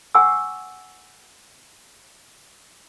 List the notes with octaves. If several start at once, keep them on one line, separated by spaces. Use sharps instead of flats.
F#5 G#5 C#6 D6 E6